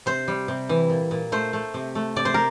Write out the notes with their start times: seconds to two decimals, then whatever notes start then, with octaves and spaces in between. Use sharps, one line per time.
0.06 C3 C5
0.28 G3
0.48 C3
0.69 E3
0.90 A#2
1.11 A#2
1.32 A3 C5
1.53 A3
1.74 C3
1.95 A3
2.16 C3 D5
2.25 C5
2.34 A#4